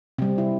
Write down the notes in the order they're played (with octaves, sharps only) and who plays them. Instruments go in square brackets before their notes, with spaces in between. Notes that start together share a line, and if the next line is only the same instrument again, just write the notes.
[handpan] C3 G3 C4
E4